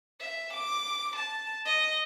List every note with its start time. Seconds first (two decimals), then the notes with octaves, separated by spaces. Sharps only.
0.20 E5
0.53 D6
1.15 A5
1.65 D#5